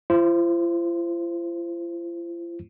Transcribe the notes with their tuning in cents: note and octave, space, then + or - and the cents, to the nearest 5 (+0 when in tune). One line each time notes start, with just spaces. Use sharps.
F4 -45 C5 +0